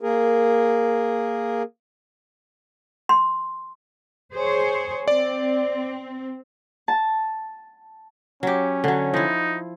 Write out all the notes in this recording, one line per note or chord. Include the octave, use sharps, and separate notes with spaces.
A#3 G#4 A#4
C6
G#4 C5 C#5
C4 D5
A5
F#3 C#4 G4
D3 F#3
F3 D#4 E4